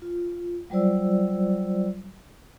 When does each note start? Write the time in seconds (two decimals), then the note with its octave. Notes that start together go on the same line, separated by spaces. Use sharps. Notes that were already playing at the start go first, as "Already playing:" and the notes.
0.02 F4
0.70 F#3 G3 F4 C5 D5 E6